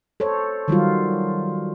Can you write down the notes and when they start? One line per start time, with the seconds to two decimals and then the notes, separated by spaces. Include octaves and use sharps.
0.20 A4 C5 C#5
0.68 D#3 F#3 G3 F4